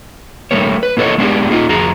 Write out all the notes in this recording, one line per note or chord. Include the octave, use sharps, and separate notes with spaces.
G3 A3 A#3 C#5
B4
A#3 E4 A4 C#5 D#5
G#3 B3 D4 G4 G#4
A#3 D#4 F4 D#5
F2 F#4 G#4 A#5